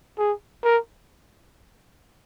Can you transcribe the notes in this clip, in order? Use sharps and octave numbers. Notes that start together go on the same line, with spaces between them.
G#4
A#4